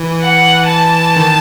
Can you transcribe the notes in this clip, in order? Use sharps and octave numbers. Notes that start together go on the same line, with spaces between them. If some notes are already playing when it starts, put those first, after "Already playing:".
Already playing: E3
F#5
A5
D#3